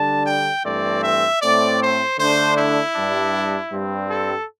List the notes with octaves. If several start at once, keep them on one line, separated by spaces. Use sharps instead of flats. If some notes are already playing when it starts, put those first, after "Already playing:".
Already playing: D3 G3 D4 A5
G5
G2 E3 A3 C4 D5
E5
A2 A3 C4 D5
C5
D3 A3 D4 C5
E4
G2 G3 D4
G2 G3 C4
A4